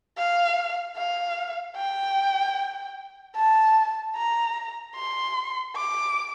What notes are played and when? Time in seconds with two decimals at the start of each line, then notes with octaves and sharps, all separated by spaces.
0.17 F5
0.97 F5
1.77 G5
3.36 A5
4.16 A#5
4.96 C6
5.76 D6